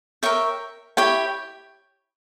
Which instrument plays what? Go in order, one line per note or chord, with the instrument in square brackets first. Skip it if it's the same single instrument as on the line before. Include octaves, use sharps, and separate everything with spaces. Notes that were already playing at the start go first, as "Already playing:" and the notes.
[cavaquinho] A#4 C#5 E5 G5
E4 G4 C#5 G5